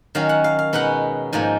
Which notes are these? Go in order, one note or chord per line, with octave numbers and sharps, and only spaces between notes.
D#3 F#3 C#4 F5
F#5
F5
F5
B2 G#3 B3 D#4 F#5
G#2 F3 A#3 D#4 G#5